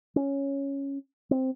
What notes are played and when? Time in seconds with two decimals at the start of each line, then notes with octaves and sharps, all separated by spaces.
0.16 C#4
1.31 C4